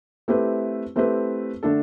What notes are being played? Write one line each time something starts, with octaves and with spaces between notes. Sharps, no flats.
A3 C4 E4 G4 B4
A3 C4 E4 G4 B4
D3 A3 D4 A4